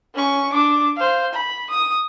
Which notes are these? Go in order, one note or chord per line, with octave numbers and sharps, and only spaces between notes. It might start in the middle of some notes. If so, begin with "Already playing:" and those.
C#4 C#6
D4 D6
C5 F5
B5
D#6